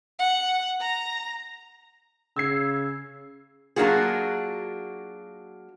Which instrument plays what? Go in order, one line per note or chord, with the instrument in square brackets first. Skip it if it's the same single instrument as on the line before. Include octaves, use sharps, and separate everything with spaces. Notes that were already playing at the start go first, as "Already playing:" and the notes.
[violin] F#5
A#5
[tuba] C#3 [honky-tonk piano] E6 G#6 C7
[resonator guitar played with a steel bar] F#3 A#3 D4 F4 F#4 G#4